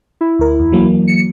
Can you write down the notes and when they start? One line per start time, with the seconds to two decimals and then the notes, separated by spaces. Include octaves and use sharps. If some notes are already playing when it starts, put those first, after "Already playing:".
0.21 E4
0.39 D2 A#4
0.59 E2
0.72 E3 F#3 A#3
1.07 C#7